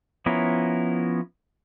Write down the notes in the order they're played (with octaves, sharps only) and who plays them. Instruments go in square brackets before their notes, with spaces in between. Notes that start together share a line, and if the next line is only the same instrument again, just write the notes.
[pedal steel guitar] F3 B3 C#4 E4 A#4